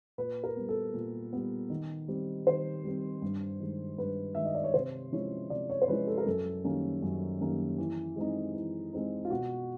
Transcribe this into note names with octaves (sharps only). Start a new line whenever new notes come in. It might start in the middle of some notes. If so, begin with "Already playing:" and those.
A#2 B4
A#4
G3 B3
A4
A#2
G3 B3
D#3
G3 C4
D#3 C5
G3 C4
G2
D#3 G#3
G2 B4
D#3 G#3 E5
D#5
D5
C#5
C3 C5
F3 G#3 C#4 E4 C#5
C3 D5
C#5
C5
F3 G#3 C#4 E4 B4
A4
A#4
F#2 A4
D#3 G3 A#3 C#4
F#2
D#3 G3 A#3 C#4
E3
G#3 C4 D#4
E3
G#3 C4 D#4
F4
B2 F#4